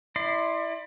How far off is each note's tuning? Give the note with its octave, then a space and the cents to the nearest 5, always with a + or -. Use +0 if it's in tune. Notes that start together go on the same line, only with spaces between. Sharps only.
E4 -5 D5 +35 C6 +0